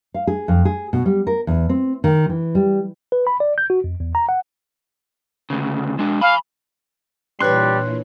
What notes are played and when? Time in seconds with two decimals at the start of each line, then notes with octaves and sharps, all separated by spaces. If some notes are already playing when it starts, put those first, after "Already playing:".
0.14 F5
0.27 G#4
0.48 F2
0.65 G#4
0.93 B2
1.06 G3
1.27 A#4
1.47 E2
1.69 C4
2.04 D#3
2.29 E3
2.55 G3
3.12 B4
3.27 B5
3.40 D5
3.58 G6
3.70 F#4
3.84 F2
4.00 E2
4.15 A#5
4.29 F#5
5.50 D2 C#3
5.99 G#3 D4
6.21 F5 G#5 B5
7.40 A#2 E3 G3 D4 B4 C#5 C6 F#6